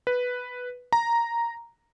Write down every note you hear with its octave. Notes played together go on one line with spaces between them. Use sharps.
B4
A#5